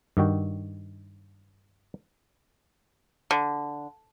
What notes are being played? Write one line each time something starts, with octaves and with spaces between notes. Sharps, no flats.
G2 D#3 F#4 G5
D3